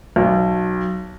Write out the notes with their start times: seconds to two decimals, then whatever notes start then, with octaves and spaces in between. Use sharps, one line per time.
0.16 B1